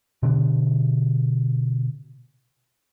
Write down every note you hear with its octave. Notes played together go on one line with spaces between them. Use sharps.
B2 D3 D4